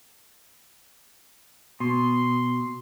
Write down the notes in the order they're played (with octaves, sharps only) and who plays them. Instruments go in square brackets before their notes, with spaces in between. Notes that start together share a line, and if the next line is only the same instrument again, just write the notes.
[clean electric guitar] B2 [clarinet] C6